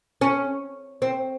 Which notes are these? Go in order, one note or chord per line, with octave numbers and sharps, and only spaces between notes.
C#4
C4